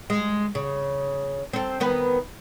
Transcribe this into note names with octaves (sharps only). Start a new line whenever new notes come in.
G#3
C#3
C4 A4
D#3 B3 B4